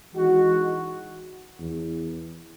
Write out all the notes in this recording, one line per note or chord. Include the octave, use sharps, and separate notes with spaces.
E3 G#3 D#4 F#4
E2